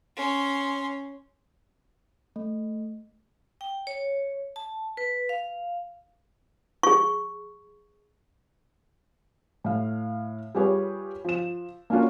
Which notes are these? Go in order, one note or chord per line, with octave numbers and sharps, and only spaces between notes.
C#4 C6
A3
G5
C#5
A5
B4
F5
G#4 C#6
A2 F5
G3 F4 G4 G#4 B4 C#5
F3 E7
A#3 C#4 D4 F4 F#4 A#4